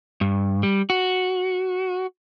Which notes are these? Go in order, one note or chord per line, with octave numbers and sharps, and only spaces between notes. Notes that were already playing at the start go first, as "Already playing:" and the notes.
G2
G3
F#4